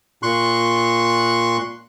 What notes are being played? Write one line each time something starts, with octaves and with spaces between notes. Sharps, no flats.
A#2 C6 C#6 F#6